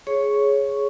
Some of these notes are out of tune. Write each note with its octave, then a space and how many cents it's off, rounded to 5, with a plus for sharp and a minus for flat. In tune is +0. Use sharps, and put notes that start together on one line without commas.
G#4 +10 C#5 +0 C#6 +0